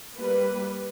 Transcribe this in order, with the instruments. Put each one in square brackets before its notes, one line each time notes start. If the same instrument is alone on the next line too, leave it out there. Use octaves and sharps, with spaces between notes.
[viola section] G3 A#3 B4